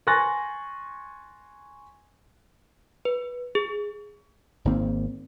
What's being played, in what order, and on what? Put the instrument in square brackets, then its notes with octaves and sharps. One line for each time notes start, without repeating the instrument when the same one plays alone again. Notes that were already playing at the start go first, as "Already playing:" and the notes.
[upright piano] G#5 C6 C#6 F#6 A6 A#6
[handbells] B4
G#4
[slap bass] G#1 D#3 A#3 C4